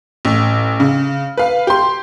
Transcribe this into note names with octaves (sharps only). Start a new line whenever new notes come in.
A1
C#3
B4 F5
G4 C6